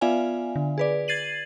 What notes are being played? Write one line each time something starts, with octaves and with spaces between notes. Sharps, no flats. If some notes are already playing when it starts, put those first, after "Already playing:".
B3 F4 D5 E5 F5 G#5
D3
G#4 B4 D5
G#6 A6 C7 D#7 F#7